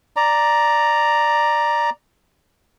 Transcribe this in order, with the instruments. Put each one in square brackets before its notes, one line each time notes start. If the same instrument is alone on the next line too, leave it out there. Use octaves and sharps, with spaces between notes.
[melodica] D5 A#5